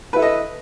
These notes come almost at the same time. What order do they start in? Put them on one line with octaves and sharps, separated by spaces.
B4 E4 A4 D#5